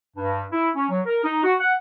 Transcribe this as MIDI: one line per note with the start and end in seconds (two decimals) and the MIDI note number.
0.17 0.43 43
0.51 0.69 64
0.76 0.85 61
0.89 1.01 54
1.06 1.23 70
1.23 1.39 63
1.43 1.53 66
1.60 1.73 78